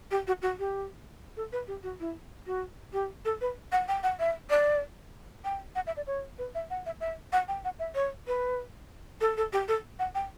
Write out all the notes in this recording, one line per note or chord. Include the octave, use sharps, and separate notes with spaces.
G4
F#4
F#4
G4
A4
B4
G4
F#4
E4
F#4
G4
A4
B4
F#5
G5
F#5
E5
D5
G5
F#5
E5
D5
C#5
B4
E5
F#5
E5
E5
F#5
G5
F#5
E5
C#5
B4
A4
A4
G4
A4
F#5
G5